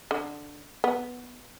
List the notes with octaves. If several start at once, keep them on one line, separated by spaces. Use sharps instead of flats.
D3
B3